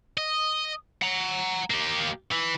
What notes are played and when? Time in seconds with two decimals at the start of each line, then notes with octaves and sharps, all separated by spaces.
0.18 D#5
1.02 F#5 A#5
1.70 A#3 G4
2.32 E3